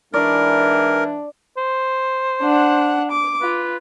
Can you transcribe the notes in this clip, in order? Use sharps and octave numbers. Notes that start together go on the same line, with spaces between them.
G#2 E3 D4 A#4 D5
C5
D4 F#5
D6
F4 B4